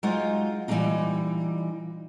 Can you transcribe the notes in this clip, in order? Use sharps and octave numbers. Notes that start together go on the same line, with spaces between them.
F#3 G#3 D#4 F4 C5 F#5
A#2 E3 G3 A#3 D4 D#4